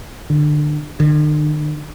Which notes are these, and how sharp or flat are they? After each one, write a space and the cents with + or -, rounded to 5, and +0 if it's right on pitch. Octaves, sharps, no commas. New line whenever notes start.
D3 +25
D3 +45